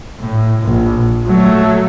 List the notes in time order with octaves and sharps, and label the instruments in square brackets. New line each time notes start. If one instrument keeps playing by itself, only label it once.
[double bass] A2
A#1
F#3 A3